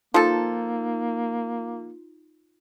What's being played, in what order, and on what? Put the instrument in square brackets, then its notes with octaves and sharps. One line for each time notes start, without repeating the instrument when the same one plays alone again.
[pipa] F3 A4 [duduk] A#3 [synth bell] D#4 F4